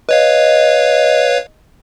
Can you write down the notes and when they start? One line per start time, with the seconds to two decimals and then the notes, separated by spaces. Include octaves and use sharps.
0.09 B4 C#5 D#5 F5